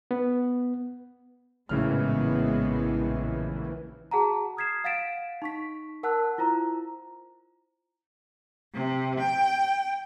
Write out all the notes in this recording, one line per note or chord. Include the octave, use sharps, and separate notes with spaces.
B3
A#1 A2 C#3 E3 G#3 B3 F6
F#4 G#4 F#5 A5 A#5
D#6 F6 G#6 B6 C7 E7
F5 F#5 A6 B6 D7 E7
D#4 C#6 B6
A#4 F#5 A5 E6 F#6
E4 F4 C5 A#5
C3
G5